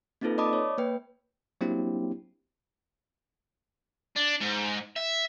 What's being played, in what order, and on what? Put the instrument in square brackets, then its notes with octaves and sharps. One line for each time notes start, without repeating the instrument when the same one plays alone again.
[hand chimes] A#3 C4 D#4 F4 A4 B4
D5 D#5 A5 B5 D6 D#6
C#5
A#3 B4 G5
[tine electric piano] F#3 A#3 C4 D4 E4 G4
[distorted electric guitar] D4
G#2
E5